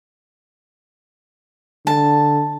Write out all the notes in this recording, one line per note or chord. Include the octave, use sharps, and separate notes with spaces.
D3 A5